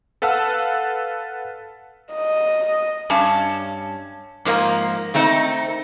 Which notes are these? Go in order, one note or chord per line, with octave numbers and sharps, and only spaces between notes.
A4 B4 F5 F#5 A5 E6
D#5
G2 C#4 A5
G#2 F3 A#3
D#3 A3 C4 D#4